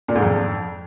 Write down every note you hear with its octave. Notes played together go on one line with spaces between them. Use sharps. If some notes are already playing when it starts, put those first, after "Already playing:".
A#2
G#2
F2